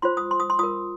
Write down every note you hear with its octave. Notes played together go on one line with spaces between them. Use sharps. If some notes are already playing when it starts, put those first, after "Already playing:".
F4 C5 C6
D#6
C6
D#6
C6
F4 A#4 D#6